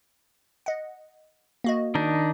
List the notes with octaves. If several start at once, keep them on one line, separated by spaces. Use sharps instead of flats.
D#5 F#5
A#3 F#4 D#5
D#3 D4 D#4